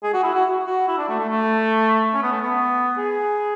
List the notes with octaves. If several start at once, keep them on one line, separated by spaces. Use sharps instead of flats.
G#4
F#4
E4
F#4
F#4
E4
D4
A3
A3
A3
C#4
B3
A3
B3
G#4